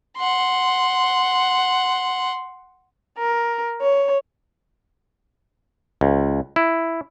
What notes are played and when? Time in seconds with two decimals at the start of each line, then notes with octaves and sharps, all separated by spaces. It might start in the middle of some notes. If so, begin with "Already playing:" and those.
0.18 F#5 C6
3.18 A#4
3.81 C#5
6.01 C#2
6.56 E4